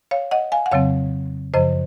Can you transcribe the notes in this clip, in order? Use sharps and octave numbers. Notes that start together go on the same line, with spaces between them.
C#5 F5
D#5 F#5
F5 G#5
F#5
F2 C#3 F#3 C4 C#5 F5
F#2 C#3 F3 C5 D#5